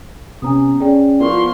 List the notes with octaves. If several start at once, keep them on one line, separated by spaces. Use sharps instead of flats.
C3 B3 C#4 G#5 A#5 D#6
C#4 G#4 D5 G5
F3 B3 E4 F4 A#4 D5 C6 C#6